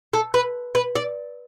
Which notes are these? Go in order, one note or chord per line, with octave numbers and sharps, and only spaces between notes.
A4
B4
B4
D5